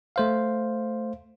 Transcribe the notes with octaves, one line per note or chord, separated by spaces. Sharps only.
A3 C5 F5